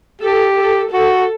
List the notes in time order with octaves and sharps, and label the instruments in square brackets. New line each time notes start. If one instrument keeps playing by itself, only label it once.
[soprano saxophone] G4 [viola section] A4
[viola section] A4
[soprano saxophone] F#4 [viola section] A4